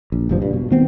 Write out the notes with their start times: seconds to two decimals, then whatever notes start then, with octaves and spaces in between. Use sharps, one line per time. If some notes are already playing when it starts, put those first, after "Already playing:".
0.12 A#1
0.29 F#1 G2 F3
0.42 G2
0.54 B2
0.71 D#3 B3 C4